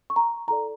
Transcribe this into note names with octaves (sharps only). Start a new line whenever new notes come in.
C#6
A#5
E4 A4 D5 A#5